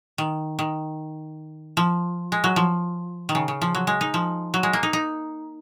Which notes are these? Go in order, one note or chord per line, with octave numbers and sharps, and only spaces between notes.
D#3
D#3
F3
G#3
F#3
F3
D#3
C#3
C#3
F3
F#3
G#3
D#4
F3
F#3
G#3
A#3
D#4
D#4